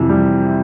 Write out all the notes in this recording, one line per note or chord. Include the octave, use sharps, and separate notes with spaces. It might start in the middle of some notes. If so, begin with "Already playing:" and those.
Already playing: F2 C3 E3
G3